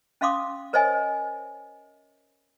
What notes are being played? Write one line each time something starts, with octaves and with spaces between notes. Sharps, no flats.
C#4 E5 F5 C6 D6 D#6
A#4 C5 C#5 D#5 E5 G#5